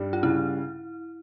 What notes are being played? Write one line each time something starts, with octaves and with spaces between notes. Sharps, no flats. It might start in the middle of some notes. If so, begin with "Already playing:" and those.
Already playing: G2 G3 D#4
F4
C#3 E4